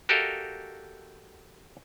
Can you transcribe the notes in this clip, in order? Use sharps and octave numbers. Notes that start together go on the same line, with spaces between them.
F#4 G4 A4 A#4 D#5 F5